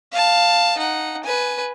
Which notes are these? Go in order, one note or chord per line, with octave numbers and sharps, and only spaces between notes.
F5 A5
D#4 F#5
B4 G#5